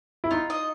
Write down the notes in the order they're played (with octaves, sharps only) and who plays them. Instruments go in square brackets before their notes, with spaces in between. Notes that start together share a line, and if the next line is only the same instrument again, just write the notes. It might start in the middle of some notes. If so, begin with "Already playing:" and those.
[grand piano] E4
[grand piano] D#4 [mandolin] F4
[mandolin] D#5